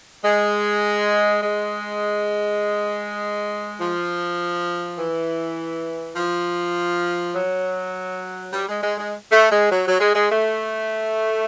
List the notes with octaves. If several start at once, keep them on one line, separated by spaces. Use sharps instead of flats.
G#3
G#3
F3
E3
F3
F#3
G3
G#3
G#3
G#3
A3
G#3
F#3
F#3
G#3
G#3
A3